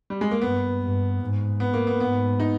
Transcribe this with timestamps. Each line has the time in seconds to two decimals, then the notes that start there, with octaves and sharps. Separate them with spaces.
0.10 G3
0.21 G#3
0.31 A#3
0.42 G2 B3
0.82 G2
1.21 G#2
1.60 B3
1.74 A#3
1.87 B3
2.00 G#2 B3
2.40 D#4